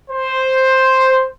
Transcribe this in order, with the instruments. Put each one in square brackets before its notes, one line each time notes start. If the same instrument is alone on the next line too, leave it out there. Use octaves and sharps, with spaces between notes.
[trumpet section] C5